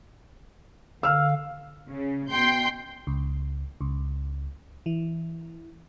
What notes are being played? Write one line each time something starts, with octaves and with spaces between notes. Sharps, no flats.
D3 F5 E6 F6
C#3
B2 G5 C6 G6
C#2
C#2
E3